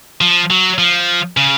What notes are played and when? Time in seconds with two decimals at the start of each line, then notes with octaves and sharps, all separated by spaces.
0.21 F3
0.50 F#3
0.78 F3
1.37 C#3